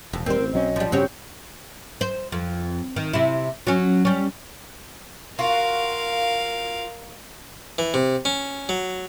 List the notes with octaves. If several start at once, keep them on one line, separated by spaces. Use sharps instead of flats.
E1 F2 C3
D#1 G3 C4 A#4 C5
A1
B1 F#3 C#4 D#5
F3 G3
G2 C#3 C4 C#4 F#4 G4 C#5
C5
F2
D#3
C3 E4
F#3 C#4
G3 C#4
F4 F#4 A#4 F5
E3
C3
C#4
F#3